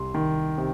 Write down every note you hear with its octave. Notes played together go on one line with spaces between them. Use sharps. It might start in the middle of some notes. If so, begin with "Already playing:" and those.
Already playing: C2 C6
D#3
C3